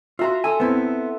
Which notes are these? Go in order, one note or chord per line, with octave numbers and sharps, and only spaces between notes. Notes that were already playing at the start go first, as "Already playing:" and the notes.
F4 F#4 E5 A#5 C6
A4 G#5 A#5 E6
B3 C4 E4